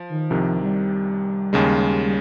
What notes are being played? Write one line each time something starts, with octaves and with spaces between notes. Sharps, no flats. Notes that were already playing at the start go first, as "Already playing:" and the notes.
Already playing: F3
D#3
C2 C3 D#3 F3
G3
D#2 C#3 G#3
G3